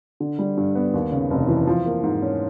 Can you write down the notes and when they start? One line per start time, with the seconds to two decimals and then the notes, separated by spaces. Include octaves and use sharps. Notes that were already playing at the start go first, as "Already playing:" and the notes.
0.20 D3
0.39 G3
0.57 G2
0.75 B3
0.94 D#2
1.12 C#3
1.31 F1
1.48 E3
1.67 F3
1.86 A#3
2.04 G#2
2.22 C#4